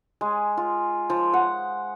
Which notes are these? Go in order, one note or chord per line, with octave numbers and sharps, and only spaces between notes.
G#3
F4
F3
F#5